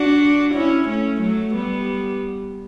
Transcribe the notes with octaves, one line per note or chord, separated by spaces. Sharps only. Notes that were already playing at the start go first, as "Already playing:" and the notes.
Already playing: D4 F#4
C#4 E4
A3 C#4
F#3 A3
G3 B3